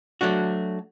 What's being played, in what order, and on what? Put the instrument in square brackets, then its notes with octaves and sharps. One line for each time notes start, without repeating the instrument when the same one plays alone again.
[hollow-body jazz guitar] F#3 A3 D4 F#4